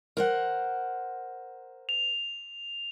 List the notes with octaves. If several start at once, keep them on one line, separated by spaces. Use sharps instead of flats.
A#4 C5 F#5
F7